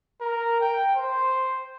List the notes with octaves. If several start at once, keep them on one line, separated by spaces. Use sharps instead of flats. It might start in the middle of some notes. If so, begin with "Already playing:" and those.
A#4
G5
C5